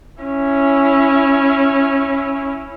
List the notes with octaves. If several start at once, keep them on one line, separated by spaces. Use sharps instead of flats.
C#4 E4